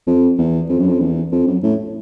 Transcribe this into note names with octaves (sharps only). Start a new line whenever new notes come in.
F2
E2
F2
F#2
F2
E2
F2
F#2
A2